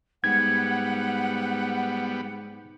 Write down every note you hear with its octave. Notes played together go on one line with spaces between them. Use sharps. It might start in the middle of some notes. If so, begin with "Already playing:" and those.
G#2 G3 B3 F#5 G#6